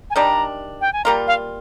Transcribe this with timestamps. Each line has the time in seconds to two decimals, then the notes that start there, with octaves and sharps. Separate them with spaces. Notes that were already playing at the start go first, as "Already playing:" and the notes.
0.10 G#5
0.16 D#3 G3 D4 A#5
0.81 G5
0.93 G#5
1.05 G3 A#3 F4 A#5
1.27 F5